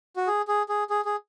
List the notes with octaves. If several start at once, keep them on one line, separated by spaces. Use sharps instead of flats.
F#4
G#4
G#4
G#4
G#4
G#4